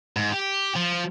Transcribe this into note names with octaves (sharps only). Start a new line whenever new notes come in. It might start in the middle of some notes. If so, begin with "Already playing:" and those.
G#2
G4
F3